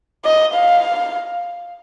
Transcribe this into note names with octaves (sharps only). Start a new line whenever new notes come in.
D#5
F5